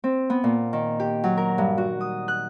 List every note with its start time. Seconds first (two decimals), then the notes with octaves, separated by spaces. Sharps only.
0.04 C4
0.30 B3
0.44 A#2
0.73 D#3
1.00 G4
1.24 F#3
1.37 A#4
1.58 G2
1.78 F#4
2.01 D#6
2.28 F#6